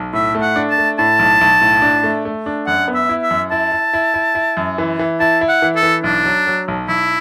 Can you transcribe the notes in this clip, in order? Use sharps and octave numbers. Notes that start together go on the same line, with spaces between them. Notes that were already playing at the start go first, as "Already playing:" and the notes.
Already playing: B1
A2 E5
A3
F#5
D4
A5
A3
A2 A5
B1
B1
A2
D4
A3
A3
D4
F#2 F#5
B3
E5
E4
E5
F#2
E4 A5
E4
E4
E4
E4
F#2
E3
E3
E4 A5
E4
F#5
E3
A4
E3
B1 D4
F#3
F#3
B1
B1 E4